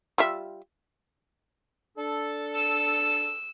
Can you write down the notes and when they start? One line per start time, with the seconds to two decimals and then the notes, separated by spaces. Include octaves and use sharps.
0.18 G3 F4 E5
1.98 D4 A4
2.56 E6